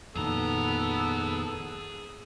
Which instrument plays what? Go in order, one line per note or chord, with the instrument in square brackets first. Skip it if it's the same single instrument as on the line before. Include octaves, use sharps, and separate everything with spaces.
[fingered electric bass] F2 A#2 D#3 [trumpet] B3 [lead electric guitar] G#4 A#5 [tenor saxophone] A4